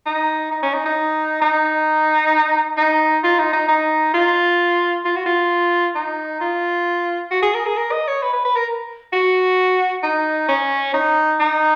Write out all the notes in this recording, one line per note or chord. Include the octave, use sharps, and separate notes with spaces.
D#4
D#4
C#4
D#4
D#4
D#4
D#4
F4
D#4
D#4
D#4
F4
F4
F#4
F4
D#4
F4
F#4
G#4
A#4
G#4
A#4
D#5
C#5
B4
B4
B4
A#4
F#4
D#4
C#4
D#4
D#4